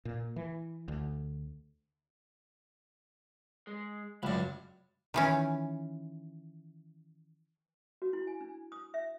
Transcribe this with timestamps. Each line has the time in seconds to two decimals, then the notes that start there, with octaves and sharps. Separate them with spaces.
0.05 A#2
0.36 E3
0.88 D2
3.67 G#3
4.23 C#2 F#2 D5 E5 B5
5.14 D#3 E3 C#4
8.02 F#4
8.13 E4
8.27 G#5
8.41 D4
8.72 D#6
8.94 E5